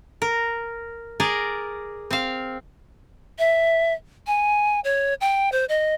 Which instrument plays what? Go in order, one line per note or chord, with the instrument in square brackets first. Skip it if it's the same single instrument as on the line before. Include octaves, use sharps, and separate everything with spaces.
[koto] A#4
G#4 A#4 D5
C4 F5
[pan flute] E5
G#5
C#5
G5
C5
D#5